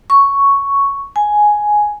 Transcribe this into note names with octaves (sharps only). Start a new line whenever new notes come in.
C#6
G#5